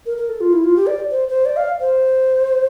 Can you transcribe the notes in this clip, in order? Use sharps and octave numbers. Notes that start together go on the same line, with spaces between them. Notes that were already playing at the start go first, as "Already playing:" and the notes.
A#4
A#4
A4
F4
E4
F4
G4
D5
C5
C5
D5
F5
C5